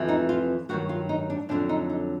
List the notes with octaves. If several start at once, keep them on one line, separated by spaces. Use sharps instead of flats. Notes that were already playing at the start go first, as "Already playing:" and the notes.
Already playing: F2 C3 E3
D#4
F4
G2 D#3 F#3 F#4
F4
D#4
D4
F2 D3 F#3 D4
D#4
D#4